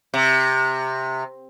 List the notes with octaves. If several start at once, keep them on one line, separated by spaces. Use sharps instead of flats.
C3